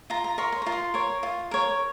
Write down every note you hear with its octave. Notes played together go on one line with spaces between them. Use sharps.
F4 A#5
A#5
A#4 C#5 C6
C6
F4 A#5
C6
A#4 C#5
F4
A#4 C#5